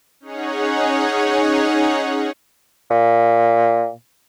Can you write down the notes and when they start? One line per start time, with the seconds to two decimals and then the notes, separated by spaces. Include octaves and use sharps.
0.20 C#4 D#4 G#4 C#5 F#5
2.90 A#2